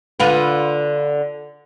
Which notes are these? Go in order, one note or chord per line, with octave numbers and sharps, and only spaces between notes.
D3 F4 B4